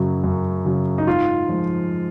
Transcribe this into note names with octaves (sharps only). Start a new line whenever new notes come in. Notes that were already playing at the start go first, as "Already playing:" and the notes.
Already playing: F#2 C#3 F#3
F#2
C#3 F#3
D#4
G#2 F4
F3 G#3